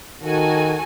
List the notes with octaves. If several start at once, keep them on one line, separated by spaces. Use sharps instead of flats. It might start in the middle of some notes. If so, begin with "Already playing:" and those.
D#3 F#4 A4 G#5